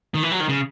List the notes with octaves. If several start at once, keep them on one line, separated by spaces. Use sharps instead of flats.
D#3
E3
F#3
D#3
C#3